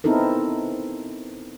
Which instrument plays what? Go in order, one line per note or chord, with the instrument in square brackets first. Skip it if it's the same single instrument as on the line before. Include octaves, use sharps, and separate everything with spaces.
[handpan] B3 C4 D#4 E4 A4 A#4